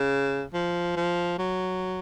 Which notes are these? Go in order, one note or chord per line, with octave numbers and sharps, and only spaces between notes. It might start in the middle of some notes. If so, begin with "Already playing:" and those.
Already playing: C#3
F3
F3
F#3